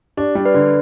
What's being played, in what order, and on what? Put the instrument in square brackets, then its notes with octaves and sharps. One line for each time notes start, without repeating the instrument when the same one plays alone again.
[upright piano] D4 [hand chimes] G4
[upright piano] G3
[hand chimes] B4 D5
[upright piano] D3